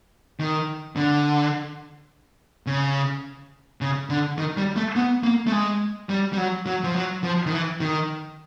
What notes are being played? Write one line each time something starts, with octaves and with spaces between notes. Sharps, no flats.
D#3
D3
C#3
C#3
D3
D#3
G3
A3
B3
A#3
A3
G#3
G3
G3
F#3
F#3
F3
F#3
F3
D#3
E3
D#3